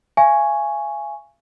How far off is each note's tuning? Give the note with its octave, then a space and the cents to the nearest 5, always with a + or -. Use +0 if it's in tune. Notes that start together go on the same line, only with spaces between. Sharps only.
F5 -40 G#5 +0 C#6 +0